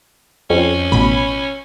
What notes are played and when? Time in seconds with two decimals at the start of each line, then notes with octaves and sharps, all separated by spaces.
0.50 F2 C#4
0.92 A1 B2 B5